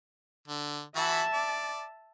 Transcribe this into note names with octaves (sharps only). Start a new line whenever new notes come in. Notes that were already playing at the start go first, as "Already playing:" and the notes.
D3
E3 F#4 E5 A5 B5
D5